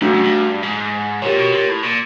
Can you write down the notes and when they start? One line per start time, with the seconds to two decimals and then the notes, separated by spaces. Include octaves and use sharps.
0.01 G2 A3 D4 F#4
0.14 F#2
0.24 G2
0.63 G#2
1.22 A#2 G4 A#4 C#5
1.38 B2
1.53 A#2
1.69 A2
1.83 A#2